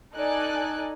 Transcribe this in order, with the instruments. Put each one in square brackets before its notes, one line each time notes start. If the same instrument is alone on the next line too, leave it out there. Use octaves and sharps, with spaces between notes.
[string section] D#4 A4 D5 G#5 F#6